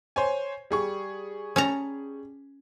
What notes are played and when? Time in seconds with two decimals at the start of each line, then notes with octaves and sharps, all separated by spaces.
0.16 C5 C#5 G#5
0.71 G3 G#4 C#6
1.56 C#4 A5 A#5